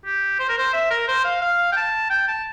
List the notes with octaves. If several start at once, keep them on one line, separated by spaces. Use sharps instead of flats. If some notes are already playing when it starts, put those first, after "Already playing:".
G4
C5
A#4
C5
E5
A#4
C5
F5
F5
G5
A5
G5
A5